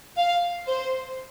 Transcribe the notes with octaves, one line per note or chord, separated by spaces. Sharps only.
F5
C5